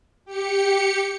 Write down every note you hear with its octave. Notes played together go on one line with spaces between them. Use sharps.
G4 C#7